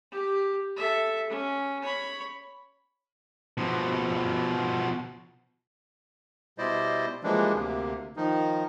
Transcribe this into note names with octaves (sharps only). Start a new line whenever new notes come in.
G4
A4 E5
C#4
C#5 B5
B2 F3
B2 G3 E4 C5 D5 D#5
E3 F3 G3 G#3 A#3 D4
D2 C3 A#3
D#3 F3 D#4